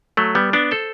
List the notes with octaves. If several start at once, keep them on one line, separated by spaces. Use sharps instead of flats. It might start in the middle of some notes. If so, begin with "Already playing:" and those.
F#3 A3
G3 B3
B3 D4
A4 C5